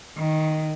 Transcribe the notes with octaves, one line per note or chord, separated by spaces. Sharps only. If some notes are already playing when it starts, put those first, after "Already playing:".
D#3